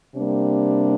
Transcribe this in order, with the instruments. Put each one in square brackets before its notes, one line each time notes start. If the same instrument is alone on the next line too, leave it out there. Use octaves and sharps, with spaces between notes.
[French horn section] C3 G3 A#3 D4